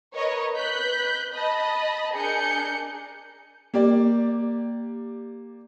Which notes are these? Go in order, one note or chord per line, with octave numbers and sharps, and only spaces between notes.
A#4 B4 C#5 D#5
B4 F#6 G6 B6
D#5 A5 B5
D4 G#4 A#4 G#5 G6 C#7
A#3 G4 D5